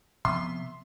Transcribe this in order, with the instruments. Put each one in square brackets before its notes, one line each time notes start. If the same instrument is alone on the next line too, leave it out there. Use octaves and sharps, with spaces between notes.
[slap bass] C3 F3 B3 [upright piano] E5 C6